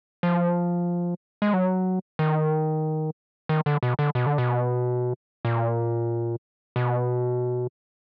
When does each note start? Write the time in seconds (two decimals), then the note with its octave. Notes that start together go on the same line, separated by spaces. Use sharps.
0.23 F3
1.42 G#3
1.53 F#3
2.19 D#3
3.49 D#3
3.66 D3
3.83 B2
3.99 D3
4.15 B2
4.26 D3
4.38 B2
5.45 A#2
6.76 B2